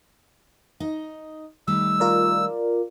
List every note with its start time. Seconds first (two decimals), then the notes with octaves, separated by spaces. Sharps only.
0.80 D#4 D#5
1.68 D#3 G3 A3 E6
2.00 F4 A#4 D5